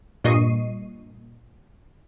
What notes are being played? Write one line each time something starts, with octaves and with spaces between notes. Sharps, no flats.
G2 A#2 D#5 C#6 C7 D#7